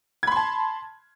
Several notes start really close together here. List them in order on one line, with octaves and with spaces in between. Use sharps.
G#6 B5 C6 A5